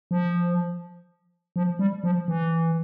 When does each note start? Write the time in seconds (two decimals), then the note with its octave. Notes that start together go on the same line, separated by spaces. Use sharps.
0.11 F3
1.56 F3
1.79 G3
2.04 F3
2.28 E3